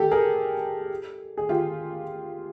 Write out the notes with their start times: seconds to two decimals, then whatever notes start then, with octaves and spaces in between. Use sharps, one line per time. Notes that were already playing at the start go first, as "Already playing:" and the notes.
Already playing: G4 A4
0.11 G#4 A#4
1.37 G#4
1.49 F4 G4